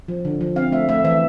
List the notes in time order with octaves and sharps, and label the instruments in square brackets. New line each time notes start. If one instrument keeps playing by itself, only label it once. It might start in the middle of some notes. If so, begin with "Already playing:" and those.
[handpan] F3
D3
F3
C4 F5
A3 E5
A3 E5
E3 E5